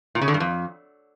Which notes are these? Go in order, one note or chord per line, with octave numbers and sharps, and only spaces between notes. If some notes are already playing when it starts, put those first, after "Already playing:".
A#2
C#3
D3
G2
F2